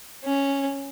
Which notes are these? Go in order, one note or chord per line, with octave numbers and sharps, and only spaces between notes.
C#4